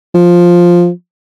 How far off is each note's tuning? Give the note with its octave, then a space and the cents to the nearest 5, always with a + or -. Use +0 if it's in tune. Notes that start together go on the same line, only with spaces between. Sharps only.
F3 +5